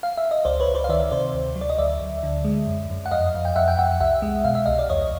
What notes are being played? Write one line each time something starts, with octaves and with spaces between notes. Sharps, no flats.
F5
E5
D#5
C#2 C5 D5
B4 C#5
C#2
C5 D5
F5
D#3 D5 E5
C3 C5 D5
D2
F#3
D5
D#5
D2 D5 E5
D2
D3
G#3
F#2
F#2
F#5
F2 D#5 F5
F2
G5
F2 E5 F#5
G5
F2 E5 F#5
C2 E5 F#5
G#3
B2 F5
E5
C2 D#5 F5
D5
E2 C#5 D#5